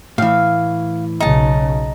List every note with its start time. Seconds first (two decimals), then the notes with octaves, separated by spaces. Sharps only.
0.18 A2 E3 F5
1.20 B1 C#3 D#4 A5